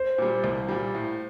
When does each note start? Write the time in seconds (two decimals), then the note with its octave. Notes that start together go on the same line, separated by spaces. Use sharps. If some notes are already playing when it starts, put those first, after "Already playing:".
Already playing: C5
0.18 A#2 G3
0.44 C2
0.69 A#2 G3
0.95 A2